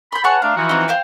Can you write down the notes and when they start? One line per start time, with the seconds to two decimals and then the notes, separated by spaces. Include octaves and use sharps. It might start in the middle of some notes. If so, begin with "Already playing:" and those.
0.12 B5 C6 G6
0.24 G#4 B4 C#5 F#5 A5 C#6
0.42 A3 D4 F5 A#5
0.56 E3 F3 F#4
0.69 C4 D#4
0.88 C5 F5 G5